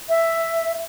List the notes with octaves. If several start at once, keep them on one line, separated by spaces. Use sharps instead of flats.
E5